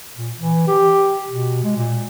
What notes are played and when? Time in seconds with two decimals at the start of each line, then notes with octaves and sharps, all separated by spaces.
0.17 A#2
0.36 E3
0.67 G4
1.28 B2
1.64 G#3
1.76 A#2